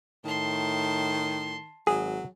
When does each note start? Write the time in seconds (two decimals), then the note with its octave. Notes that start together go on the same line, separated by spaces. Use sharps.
0.25 A2 D#3 A5 C6
1.87 G#1 F#3 G#4